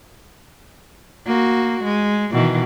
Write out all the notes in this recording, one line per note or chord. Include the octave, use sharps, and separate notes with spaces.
A#3 F#4
G#3
B2 D#3 E3